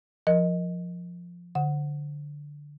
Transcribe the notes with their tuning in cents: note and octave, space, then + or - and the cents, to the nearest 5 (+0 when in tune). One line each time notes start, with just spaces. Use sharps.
F3 +0 A#4 +5 D#5 +0
D3 +0 F#5 +0